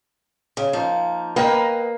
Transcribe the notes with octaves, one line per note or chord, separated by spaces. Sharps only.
C#3
F3 A#3 D#4
A#3 B4 D#5 G5